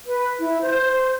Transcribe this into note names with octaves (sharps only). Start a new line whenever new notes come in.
B4
E4
C5